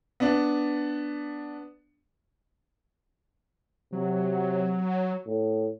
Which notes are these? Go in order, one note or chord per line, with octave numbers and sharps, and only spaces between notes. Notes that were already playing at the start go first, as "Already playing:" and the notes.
B3 D4
C3 F#3
A2